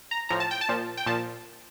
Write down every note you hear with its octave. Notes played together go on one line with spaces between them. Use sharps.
A#5
A2 F3 A#5
A5
G5
A5
A#2 F3
G5
A#2 F3 A5